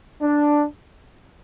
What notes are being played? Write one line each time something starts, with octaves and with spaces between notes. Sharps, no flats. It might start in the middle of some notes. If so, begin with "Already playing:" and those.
D4